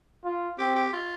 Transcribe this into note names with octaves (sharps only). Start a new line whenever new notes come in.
F4
C4 G4
G4
F4